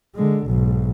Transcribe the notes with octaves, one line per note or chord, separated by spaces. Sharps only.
D3 G#3
B1 G#2